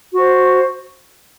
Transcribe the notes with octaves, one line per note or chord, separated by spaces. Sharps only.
F#4 C5